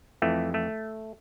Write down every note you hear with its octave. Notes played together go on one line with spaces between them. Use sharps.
F2 E3 A3
A3